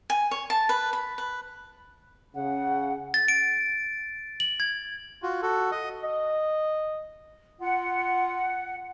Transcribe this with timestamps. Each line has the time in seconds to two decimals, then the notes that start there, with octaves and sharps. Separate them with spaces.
0.10 G#5
0.31 C#5
0.50 A5
0.69 B4
0.93 B5
1.18 B4
2.35 C#3 F#5
3.14 A6
3.28 D7
4.40 F#7
4.60 G#6
5.22 F4 F#4
5.42 F#4 A4
5.71 D#5
6.04 D#5
7.61 F4 F#5